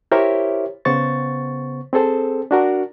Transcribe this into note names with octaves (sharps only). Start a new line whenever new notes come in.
E4 G4 A#4 C5 C#5 E5
C#3 B3 C5 C#6 A6
C4 G#4 A4 C5
D4 F#4 A#4